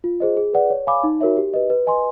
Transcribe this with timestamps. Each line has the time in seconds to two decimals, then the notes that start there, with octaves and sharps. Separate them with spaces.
0.04 F4
0.20 G#4 C5 D#5
0.37 G#4
0.53 B4 D5 F#5
0.70 C#5
0.87 F5 G#5 B5 D6
1.04 D#4
1.21 F#4 A#4 C#5 E5
1.37 G4
1.54 B4 D#5
1.70 B4
1.87 D#5 G#5 C6